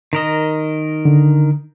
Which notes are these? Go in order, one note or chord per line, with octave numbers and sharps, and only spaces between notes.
D#3 A#4 D#5
D3